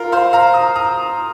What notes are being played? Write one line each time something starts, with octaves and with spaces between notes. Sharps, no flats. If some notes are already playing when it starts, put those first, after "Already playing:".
Already playing: F4 A#4
C5 F5
F5 A#5
A#5 D#6
A#5 D#6